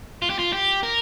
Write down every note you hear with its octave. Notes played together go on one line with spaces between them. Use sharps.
F4
G4
F4
G4
A#4